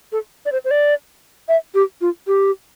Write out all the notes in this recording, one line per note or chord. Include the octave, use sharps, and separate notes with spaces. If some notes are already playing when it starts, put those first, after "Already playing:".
A4
D5
C5
C5
D5
E5
G4
F4
G4